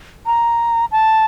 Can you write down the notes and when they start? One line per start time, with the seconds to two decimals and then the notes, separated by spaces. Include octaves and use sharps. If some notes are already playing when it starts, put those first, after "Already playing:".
0.26 A#5
0.92 A5